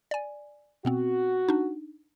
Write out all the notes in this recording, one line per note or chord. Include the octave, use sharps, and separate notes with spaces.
D5 G#5
B2 B3 C4 F#4
D4 D#4